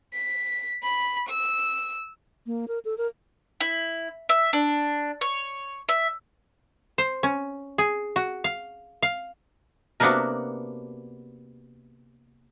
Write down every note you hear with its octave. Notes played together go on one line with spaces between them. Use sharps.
B6
B5
E6
A#3
A#4
A4
A#4
E4
E5
D4
C#5
E5
C5
C#4
G#4
F#4
F5
F5
C3 A#3 B3 D4 F#4 A#4